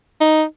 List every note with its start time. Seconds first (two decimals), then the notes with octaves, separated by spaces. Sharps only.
0.21 D#4